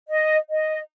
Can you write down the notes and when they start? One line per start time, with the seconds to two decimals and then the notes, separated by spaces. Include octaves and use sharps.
0.08 D#5
0.50 D#5